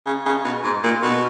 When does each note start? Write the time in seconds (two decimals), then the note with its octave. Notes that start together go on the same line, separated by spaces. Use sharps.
0.06 C#3
0.26 C#3
0.44 B2
0.64 G#2
0.83 A#2
1.03 B2